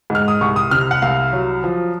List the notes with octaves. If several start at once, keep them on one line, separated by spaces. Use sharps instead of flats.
G#2 F6
D#6
C2 C#6
D#6
C3 F6
F#5
C2 F5
F#3
F3